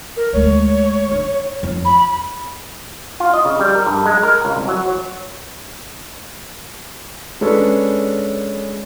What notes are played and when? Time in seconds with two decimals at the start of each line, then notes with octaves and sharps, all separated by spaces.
0.17 A#4
0.33 D2 G#3 C#5
1.11 D4
1.63 F2
1.85 B5
3.20 F4
3.34 D#5
3.45 C#3
3.60 G3
3.75 A#4
3.86 G2
4.06 G#3
4.23 A#4
4.45 C#2
4.57 C2
4.68 F#3
4.88 C#5
7.41 G#3 C#4 D4 A4 B4 C#5